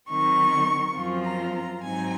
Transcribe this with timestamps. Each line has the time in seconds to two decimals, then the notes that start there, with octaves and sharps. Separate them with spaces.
0.10 D#3 F#3 C4 D#4 C#6
0.97 F#2 F3 C4 F4
1.25 A#5
1.55 A#5
1.83 G#2 F#3 C4 D#4 G#5